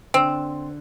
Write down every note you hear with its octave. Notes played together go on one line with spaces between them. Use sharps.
D3 C4